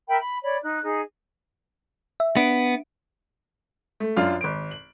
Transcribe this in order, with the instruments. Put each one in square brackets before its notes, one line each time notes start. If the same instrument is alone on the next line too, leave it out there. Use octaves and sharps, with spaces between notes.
[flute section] A#4 E5 G5 B5
B5
C#5 D5 B5
D#4 F#6
D#4 G#4
[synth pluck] E5
[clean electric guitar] B3 [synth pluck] D4 D7
[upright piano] A3
F#2 D4 F4
G#1 D7
F#7